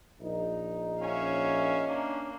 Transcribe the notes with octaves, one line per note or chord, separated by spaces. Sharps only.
A#1 D#4
C#4 E5 F5
A#3 D4